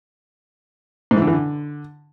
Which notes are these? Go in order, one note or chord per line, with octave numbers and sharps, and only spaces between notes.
G#2
E3
D3
E3
D3